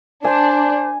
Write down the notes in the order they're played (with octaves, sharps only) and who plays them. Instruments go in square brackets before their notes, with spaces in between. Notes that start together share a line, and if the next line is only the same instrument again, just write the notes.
[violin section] D4 [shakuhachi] C5 [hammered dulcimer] G#5